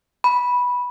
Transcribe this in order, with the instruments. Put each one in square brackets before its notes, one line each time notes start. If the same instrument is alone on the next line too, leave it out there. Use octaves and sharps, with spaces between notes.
[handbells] B5